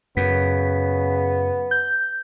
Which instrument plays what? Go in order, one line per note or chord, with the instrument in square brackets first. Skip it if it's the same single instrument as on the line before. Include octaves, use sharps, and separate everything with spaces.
[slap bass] F#2 [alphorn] C#3 [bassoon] B3 [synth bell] B6
[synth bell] G6